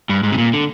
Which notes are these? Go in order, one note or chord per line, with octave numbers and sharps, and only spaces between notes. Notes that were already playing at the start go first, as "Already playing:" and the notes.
G2
G#2
C3
A#2
D3